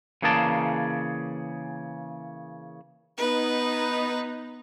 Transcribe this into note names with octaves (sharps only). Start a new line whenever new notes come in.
C#3 E3 A#3 G#4 D5 A5
B3 D#4 B4